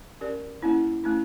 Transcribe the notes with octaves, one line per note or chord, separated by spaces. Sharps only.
C#4 G4 A#4 D5
A#3 C#4 E4
A3 C#4 E4